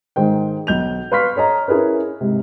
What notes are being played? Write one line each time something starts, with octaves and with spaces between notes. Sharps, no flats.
G#2 D#3 C5 G5
B1 G6 F7
B4 F5 C6 C#6 F6 B6
A4 C#5 D#5 A#5
C#4 E4 G#4 A#4 B4
G#2 C3